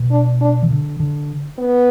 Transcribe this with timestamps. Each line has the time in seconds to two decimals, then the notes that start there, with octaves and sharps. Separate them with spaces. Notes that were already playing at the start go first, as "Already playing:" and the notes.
Already playing: B2
0.11 D4
0.41 D4
0.63 E3
0.70 D3
1.00 D3
1.59 B3